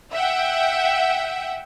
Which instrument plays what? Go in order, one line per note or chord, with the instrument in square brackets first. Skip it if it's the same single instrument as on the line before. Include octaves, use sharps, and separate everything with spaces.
[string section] E5 F#5 G5